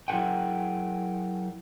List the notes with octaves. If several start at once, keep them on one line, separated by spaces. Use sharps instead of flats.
F#3 E4 G#4 A#4 F#5 G5